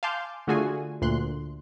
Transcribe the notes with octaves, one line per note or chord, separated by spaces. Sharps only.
F5 G#5 A5 C6 D6 G6
D3 A3 F4 F#4 G#4 G#5
D2 A#2 C6 F#6